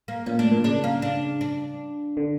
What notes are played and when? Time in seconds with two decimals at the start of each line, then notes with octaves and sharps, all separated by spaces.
0.08 A#3
0.26 A#2 C#4
0.39 A2 D4
0.52 A#2
0.64 C#3 D4
0.84 A#3
1.02 D4
1.41 D4
2.17 D3